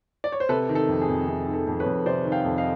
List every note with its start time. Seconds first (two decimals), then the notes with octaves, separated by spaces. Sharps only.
0.24 D5
0.32 C#5
0.40 C5
0.49 C3 A4 B4
0.69 D#3
0.75 A4
0.88 F2
1.02 G#4
1.08 F2
1.27 C3 G#4
1.47 D#3
1.54 A4
1.67 F2
1.79 B4 C#5
1.86 F2
2.06 C3 C5 D5
2.25 D#3
2.32 F5 G5
2.45 F2
2.57 D#5 F5